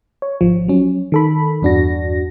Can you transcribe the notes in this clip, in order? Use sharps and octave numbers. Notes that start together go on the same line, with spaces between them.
C#5
G#1 F3
F#3 C#4
D#3 A4 B5
E2 G2 D4 F#4 A#6